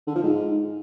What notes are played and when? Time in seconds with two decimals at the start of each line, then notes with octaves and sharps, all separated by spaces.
0.07 D3
0.15 F3
0.23 G#2